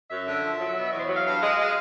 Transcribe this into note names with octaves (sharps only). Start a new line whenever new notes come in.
F#2 E5
D3
F3
F#3
B2
E2 C#5
C5
C#5
F#3
F5
G2 F5
G#3
G#3